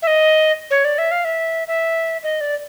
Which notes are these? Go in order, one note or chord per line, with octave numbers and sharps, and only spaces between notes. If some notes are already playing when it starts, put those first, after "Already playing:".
E5
D#5
C#5
D5
E5
F5
E5
E5
D#5
D5